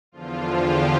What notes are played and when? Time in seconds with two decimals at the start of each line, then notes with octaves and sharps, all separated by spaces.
0.12 E2 D3 F3 F4
0.51 G4